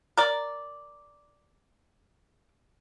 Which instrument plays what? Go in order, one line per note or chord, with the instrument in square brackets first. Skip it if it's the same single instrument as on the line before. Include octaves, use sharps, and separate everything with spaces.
[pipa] A#4 D5